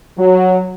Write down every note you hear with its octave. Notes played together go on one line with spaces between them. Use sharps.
F#3